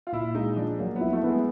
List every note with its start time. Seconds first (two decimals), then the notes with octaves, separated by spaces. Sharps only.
0.07 F4
0.12 A#2 E4
0.35 G#3 D#4
0.57 F3 D4
0.79 F#3 A#3
0.96 B3 E4
1.13 A3
1.23 B3
1.29 G#3